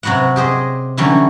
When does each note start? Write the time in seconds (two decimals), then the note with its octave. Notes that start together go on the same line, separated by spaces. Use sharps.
0.03 C3 F#3 F#4 B4 F#5
0.36 G4 G#4 C5 D#5
0.97 D3 E3 F#3 G3 C#4 A4